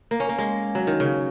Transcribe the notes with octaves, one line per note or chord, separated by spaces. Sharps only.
A#3
C#4
A#3
G#3
F#3
D#3
C#3